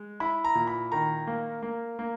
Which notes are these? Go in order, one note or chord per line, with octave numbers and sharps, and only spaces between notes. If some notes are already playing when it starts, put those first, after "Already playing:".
Already playing: G#3
E4 B5
A#5
A#2
B5
D#3 A#5
A#3
A#3
A#3